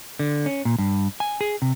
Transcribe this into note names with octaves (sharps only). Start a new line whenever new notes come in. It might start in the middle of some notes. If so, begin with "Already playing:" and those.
D3
C#4
A#2
G2
G#5
G#4
C3